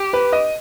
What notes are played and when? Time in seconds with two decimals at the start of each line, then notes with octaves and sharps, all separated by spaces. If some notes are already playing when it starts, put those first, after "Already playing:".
Already playing: G4
0.13 B4
0.32 D#5